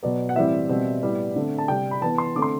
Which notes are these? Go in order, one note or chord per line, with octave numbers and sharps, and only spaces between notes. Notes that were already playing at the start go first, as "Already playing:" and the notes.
B2 F#3 B3 D5
F#5
A2 E3 G3 C4 E5
B2 G3 C4
A2 G3 B3
D3 A3 C4
A5
C3 G3 C4 G5
B5
E3 B3 A5
C6
D3 A3 C4 D6
C6